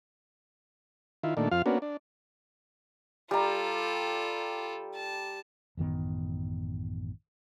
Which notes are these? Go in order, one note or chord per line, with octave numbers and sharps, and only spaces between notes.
D#3 E4 F4
A#2 D#3 A3 D4
F2 F4 F5
A#3 B3 C#4 D4 F#4
D4
G3 F4 A4 A#5
A5
A1 F#2 D#3 B3